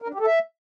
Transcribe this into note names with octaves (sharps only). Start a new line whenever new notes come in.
A#4
D4
G4
A4
E5